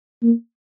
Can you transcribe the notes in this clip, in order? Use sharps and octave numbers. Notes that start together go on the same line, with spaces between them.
A#3